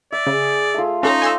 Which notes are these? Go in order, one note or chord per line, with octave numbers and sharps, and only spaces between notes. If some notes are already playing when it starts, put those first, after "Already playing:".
D5 E5
C#3 G#4
A3 F4
C#4 D#4 A4 C5 C#5 A#5
A4 G#5 C6 E6